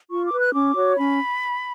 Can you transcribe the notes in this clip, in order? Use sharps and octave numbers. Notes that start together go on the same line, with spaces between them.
F4 C#6
D6
B4
F#6
C#4 D6
F#4 C#5
C#4 B5